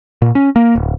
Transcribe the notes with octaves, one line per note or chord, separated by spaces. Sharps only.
A#2
C#4
A#3
D1